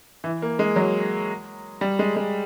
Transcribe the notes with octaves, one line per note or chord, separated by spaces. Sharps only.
E3
A#3
G#3
F#3
G3
G#3
G#3